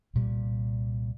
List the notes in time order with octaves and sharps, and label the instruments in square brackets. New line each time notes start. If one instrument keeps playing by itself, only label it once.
[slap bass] C2 A#2 G3